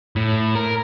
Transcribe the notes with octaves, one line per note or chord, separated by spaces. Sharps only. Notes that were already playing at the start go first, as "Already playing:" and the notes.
A2
A#4